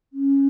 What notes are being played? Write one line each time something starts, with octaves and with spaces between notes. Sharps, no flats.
C#4